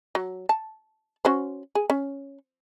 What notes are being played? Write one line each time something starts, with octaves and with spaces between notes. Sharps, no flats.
F#3
A5
C#4 F#4 C5
G#4
C#4